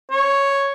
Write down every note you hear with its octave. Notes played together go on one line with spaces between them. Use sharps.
C#5